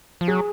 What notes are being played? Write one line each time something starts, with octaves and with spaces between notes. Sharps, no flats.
F3
F#3 G#4